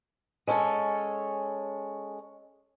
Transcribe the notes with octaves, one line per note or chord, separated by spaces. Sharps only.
G#3 C#4 A4 C#5